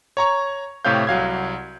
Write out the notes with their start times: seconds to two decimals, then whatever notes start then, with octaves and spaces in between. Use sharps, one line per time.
0.17 C#5 A#5 C#6
0.85 A2 C3 G4 C#5 F5 G6
1.07 C2 F#3 F5 G#6